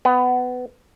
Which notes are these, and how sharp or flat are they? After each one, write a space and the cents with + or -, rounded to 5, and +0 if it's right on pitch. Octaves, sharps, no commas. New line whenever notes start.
B3 +20